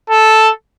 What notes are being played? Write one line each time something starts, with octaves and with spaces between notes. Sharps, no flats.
A4